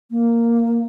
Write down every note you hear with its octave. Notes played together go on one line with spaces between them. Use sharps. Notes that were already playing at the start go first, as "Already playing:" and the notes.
A#3